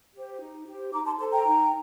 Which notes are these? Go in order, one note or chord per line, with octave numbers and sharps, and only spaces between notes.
G4 C5
D#4
G4 C5
D#4 A#5 D6
A5 C6
A4 C5 A5 C6
G5 A#5
D#4